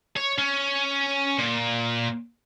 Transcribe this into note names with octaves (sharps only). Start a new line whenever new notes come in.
C#5
C#4
A#2